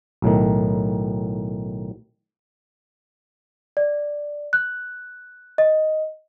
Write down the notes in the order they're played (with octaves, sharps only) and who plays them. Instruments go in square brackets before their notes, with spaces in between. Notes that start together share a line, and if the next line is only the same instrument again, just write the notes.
[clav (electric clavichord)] B1 A2 D#3
[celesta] D5
F#6
D#5